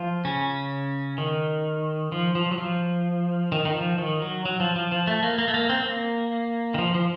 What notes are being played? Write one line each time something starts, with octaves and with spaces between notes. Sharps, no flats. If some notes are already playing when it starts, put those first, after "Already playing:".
Already playing: F3 F4
C#3 C#4
D#3
F3
F3
F#3
F3
D#3
D#3
F3
D#3
F#3
F#3
F3
F3
F3
A3
A#3
A#3
A3
A#3
C4
A#3
D#3
F3
F3